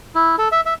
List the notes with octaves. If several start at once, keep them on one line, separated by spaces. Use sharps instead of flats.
E4
A4
E5
E5